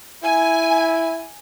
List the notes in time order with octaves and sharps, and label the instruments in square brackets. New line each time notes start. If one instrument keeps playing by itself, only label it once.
[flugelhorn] E4 [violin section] G#5